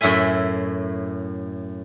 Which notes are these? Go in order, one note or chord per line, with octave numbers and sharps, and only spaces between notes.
F#2 A2 E4 E5 G#5